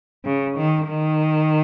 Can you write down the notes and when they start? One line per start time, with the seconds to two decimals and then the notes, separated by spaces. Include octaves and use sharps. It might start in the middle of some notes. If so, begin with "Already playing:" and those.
0.25 C#3
0.57 D#3
0.88 D#3